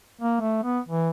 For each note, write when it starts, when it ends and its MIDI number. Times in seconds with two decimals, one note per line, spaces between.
0.21 0.37 58
0.40 0.61 57
0.64 0.79 59
0.88 1.10 52